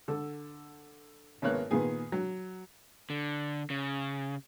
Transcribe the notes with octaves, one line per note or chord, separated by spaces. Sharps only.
D3 A4
G#1 A#3 B3 C#5 F#6
A#2 D#3 B3 G#4
F#3
D3
C#3